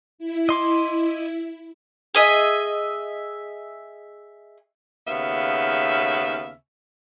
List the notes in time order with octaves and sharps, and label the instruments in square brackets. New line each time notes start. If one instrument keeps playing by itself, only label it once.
[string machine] E4
[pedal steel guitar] D#5 C6 D6
[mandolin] G#4 D#5 E5
[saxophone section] D#2 C#3 B3 E5 F5